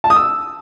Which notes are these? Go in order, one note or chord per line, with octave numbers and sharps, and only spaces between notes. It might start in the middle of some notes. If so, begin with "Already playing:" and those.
A5
D#6
E6